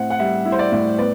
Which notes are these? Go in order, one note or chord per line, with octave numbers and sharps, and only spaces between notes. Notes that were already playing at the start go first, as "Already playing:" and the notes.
Already playing: A2 C4 E4 F#5
F#5
G3 E5
E4
C5
D5
A2
B3 D5